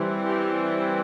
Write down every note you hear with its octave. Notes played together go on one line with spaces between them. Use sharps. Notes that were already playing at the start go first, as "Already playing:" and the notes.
Already playing: E3 G3 C4
G4